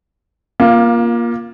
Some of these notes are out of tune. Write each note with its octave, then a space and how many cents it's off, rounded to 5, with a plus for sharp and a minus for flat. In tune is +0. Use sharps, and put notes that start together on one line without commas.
A#3 +20 F4 +0